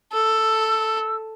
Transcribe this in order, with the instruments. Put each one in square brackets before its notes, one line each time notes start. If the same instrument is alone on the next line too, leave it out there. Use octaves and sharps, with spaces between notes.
[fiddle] A4 [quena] E6